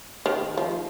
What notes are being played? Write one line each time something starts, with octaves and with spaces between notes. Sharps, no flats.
D#3
F3